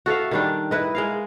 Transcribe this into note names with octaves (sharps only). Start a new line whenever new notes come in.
F#4 A4 E5 F5
D#3 G3 D4
E4 B4 D#5
G#3 A#4 F5